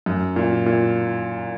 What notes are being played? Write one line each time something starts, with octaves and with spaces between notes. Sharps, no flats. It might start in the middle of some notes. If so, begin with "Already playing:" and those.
F#2
A#2
A#2